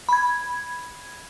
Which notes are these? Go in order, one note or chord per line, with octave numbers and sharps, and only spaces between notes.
B5 G#6